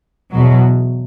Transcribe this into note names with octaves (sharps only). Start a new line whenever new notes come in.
E2 B2 F#3